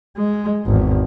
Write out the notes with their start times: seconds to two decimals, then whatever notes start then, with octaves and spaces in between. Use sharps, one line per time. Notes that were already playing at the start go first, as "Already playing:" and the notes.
0.17 G#3
0.66 G#1 E2